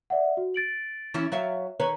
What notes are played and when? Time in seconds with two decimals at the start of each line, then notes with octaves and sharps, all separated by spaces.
0.10 D5 E5 F#5
0.37 F#4
0.54 A6 D7 F#7
1.14 E3 C#4 E4
1.32 F#3 E5 F5
1.80 D#3 B4 C#5 A#5